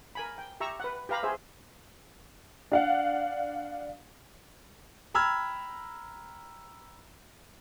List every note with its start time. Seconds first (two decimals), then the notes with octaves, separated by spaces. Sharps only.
0.15 A#4 G#5 B5
0.38 G5
0.60 G4 E5 A#5 C#6 E6
0.80 B4 F#5
1.09 G4 B4 F5 A#5 B5
1.23 G#4 C5 E5
2.72 D4 F5 F#5
5.14 G5 A#5 B5 E6 F6 G#6